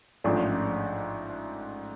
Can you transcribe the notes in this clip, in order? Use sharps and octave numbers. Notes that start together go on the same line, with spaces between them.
A1 G#2 F3 A3 D4